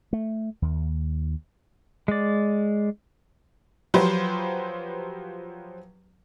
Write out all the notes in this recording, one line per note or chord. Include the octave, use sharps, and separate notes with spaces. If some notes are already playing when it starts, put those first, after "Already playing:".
A3
D#2
G#3 D5
F3 F#3 G4 B4 C5